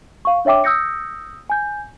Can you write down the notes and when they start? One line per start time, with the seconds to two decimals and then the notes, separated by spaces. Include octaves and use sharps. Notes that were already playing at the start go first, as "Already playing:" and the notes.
0.25 F5 C#6
0.45 D4 C#5 E5 G5 D6
0.64 D#6 E6 G6 A#6 C#7
1.50 G#5 G6